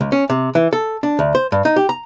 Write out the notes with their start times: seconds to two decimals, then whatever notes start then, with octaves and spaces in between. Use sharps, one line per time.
0.01 C#2
0.12 C#4
0.30 C3
0.55 E3
0.73 A4
1.03 D4
1.19 D2
1.35 C5
1.52 G2
1.65 D#4
1.76 G4
1.89 A#5